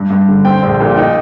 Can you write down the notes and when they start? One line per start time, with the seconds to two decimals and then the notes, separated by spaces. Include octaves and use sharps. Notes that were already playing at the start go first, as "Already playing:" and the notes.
Already playing: G2
0.10 G2
0.28 D3
0.45 C4 G5
0.62 A#1
0.80 A#2
0.96 D#4 G5